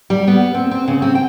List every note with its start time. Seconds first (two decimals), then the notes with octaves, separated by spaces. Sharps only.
0.10 G3
0.28 B3
0.55 C4
0.71 C4
0.88 C#3
1.02 C4
1.15 G5